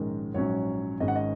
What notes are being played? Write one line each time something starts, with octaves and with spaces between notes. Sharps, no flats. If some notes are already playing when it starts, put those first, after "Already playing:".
Already playing: A#1 G#2 D#3 G#3 C#4 A#4
A#1 G#2 F#3 C#4 C#5
G#1 G#2 G#3 C#4 D#5
F#5
D#5